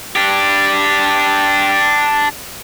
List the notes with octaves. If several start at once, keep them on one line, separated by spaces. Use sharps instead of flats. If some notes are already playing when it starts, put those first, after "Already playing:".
D4 G4